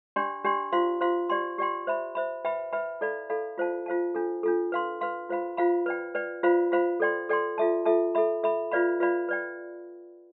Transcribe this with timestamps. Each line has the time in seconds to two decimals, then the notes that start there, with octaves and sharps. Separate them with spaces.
0.16 D4 G4 D5 G5 C6
0.45 D4 G4 D5 G5 C6
0.73 F4 C5 F5 C6
1.01 F4 C5 F5 C6
1.29 G4 D5 G5 C6
1.58 G4 D5 G5 C6
1.87 C5 E5 B5
2.15 C5 E5 B5
2.45 B4 E5 G5 B5
2.73 B4 E5 G5 B5
3.01 E4 A4 D5 F5 B5
3.30 E4 A4 D5 F5 B5
3.58 F4 C5 F5 A5
3.86 F4 C5 F5 A5
4.15 D4 F4 A4
4.43 D4 F4 A4
4.72 B4 F5 C6
5.01 B4 F5 C6
5.29 F4 C5 F5 B5
5.57 F4 C5 F5 B5
5.86 B4 D5 G5
6.15 B4 D5 G5
6.43 F4 C5 F5 B5
6.72 F4 C5 F5 B5
7.00 A4 D5 G5 C6
7.29 A4 D5 G5 C6
7.58 F4 A4 E5 A5
7.85 F4 A4 E5 A5
8.15 A4 E5 B5
8.43 A4 E5 B5
8.71 F4 B4 D5 F5 B5
9.00 F4 B4 D5 F5 B5
9.29 B4 D5 G5